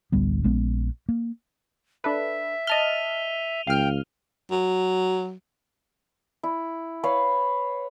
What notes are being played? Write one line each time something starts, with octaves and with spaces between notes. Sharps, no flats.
A1 D2 G3 B3
A#1 G#3 B3 C#4
A#3
D4 A4 B4 E5
D#5 A5 F6 D#7 F7 G7
C#2 F5 G5 F6
F#3
E4
B4 C#5 F5